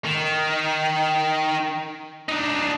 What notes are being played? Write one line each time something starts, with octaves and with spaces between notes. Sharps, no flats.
D#3
D4 D#4